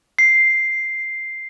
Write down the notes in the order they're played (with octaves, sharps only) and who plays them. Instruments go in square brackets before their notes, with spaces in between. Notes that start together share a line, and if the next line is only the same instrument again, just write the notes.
[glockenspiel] C7